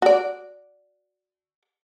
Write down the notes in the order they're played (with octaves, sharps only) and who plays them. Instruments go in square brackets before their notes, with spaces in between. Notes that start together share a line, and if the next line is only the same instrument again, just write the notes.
[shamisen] F#4 D5